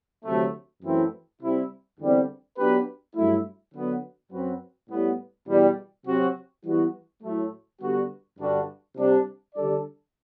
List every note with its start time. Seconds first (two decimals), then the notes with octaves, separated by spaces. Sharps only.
0.24 D2 C3 F#3 A3
0.83 F#2 E3 A3 C4 E4
1.41 C3 G3 C4 E4
1.99 E2 D3 G3 C4
2.58 F#3 B3 D4 G4 B4
3.16 G2 F#3 A3 E4
3.73 D3 F#3 B3
4.32 F#2 F#3 C4 F#4 B4
4.90 A2 G3 B3
5.48 E2 B2 G3
6.06 C3 F#3 C4 F#4
6.64 E3 G3 B3 F#4
7.23 A2 F#3 A3
7.81 D3 G3 B3 F#4
8.39 G2 D3 G3 D4 F#4
8.97 C3 G3 D4
9.55 D3 G3 D4 A4 D5